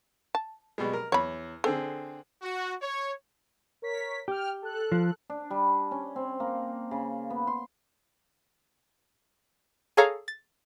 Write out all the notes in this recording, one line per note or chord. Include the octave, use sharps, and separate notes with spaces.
A5
B2 G3 G#3
A#4
E2 C#5 B5
D3 C4 G#4 A4
F#4
C#5
A#4 C#5 B6
G4 G5 F6
A4 F#6
F3
D4
G3
C#4
C4
A#3
C#3
B3
C6
G#4 A4 C#5 F5 G#5 A#5
A6